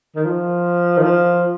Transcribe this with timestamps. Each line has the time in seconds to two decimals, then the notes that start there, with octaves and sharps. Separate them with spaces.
0.16 D#3
0.25 F3
0.98 D#3
1.03 F3